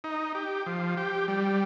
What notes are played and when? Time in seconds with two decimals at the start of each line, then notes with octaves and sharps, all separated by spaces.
0.04 D#4
0.35 G4
0.66 F3
0.97 G4
1.28 G3